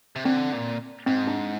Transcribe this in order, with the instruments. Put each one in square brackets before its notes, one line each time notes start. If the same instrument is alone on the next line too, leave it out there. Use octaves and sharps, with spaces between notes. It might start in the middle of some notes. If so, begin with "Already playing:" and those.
[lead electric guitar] C3
[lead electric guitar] D3 [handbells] C4
[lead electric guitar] A#2
[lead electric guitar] G#2 [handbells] C4
[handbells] D4